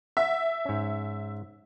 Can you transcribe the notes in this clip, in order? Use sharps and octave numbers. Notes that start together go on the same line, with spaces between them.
E5 F#5
G#2 C#4